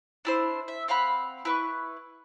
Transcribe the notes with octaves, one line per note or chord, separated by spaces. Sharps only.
D4 E4 C5
E5
C4 F5 F#5 B5
E4 B4 C#6